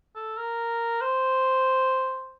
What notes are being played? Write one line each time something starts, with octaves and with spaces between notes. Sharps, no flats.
A4
A#4
C5